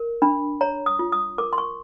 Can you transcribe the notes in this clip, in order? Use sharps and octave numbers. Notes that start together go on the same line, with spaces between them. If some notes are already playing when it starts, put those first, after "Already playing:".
Already playing: A#4
D4 B5
C#5 A#5
D#6
F4
D#6
A#4 D6
C6
C#6